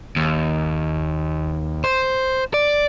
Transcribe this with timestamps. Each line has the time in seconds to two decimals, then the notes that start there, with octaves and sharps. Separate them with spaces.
0.16 D#2
1.84 C5
2.54 D5